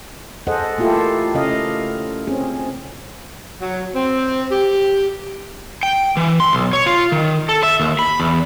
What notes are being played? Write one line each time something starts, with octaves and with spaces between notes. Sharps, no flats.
G#4 A4 C5 D#5 F#5
A3 A#3 E4 F4 G4 A4
C#3 A3 C#4 D#5 F5
C4 C#4 G#4
F#3
C4
G4
G5
E3
C6
B1
C#5
F4
D#3
A4
E5
D#2
B5
E2